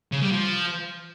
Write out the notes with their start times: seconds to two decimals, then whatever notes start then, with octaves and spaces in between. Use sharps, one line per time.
0.12 C#3
0.22 G3
0.32 F3